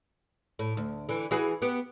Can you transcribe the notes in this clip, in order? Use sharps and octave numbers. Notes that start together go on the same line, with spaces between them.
A2
D2
D3 E3
E3 F#4 G#4
B3 G4